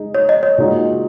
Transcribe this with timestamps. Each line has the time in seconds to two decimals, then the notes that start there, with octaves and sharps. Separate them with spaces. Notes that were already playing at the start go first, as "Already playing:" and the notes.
Already playing: G#3 D#4 G#4
0.14 C#5
0.29 D#5
0.43 C#5
0.58 A#2 G#3 D#4 F#4